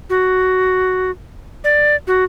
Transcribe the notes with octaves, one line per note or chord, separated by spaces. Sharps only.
F#4
D5
F#4